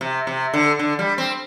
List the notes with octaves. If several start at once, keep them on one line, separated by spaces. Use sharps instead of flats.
C3
C3
D3
D3
G3
C4